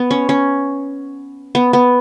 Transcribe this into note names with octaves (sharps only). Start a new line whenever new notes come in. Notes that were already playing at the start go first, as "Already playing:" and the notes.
Already playing: B3
C#4
C#4
B3
B3